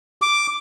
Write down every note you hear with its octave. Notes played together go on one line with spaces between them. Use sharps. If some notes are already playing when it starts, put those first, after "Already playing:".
D6